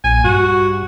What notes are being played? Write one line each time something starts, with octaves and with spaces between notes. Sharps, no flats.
A#1 G#5
G2 F#4